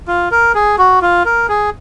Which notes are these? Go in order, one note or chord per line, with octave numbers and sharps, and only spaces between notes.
F4
A#4
G#4
F#4
F4
A#4
G#4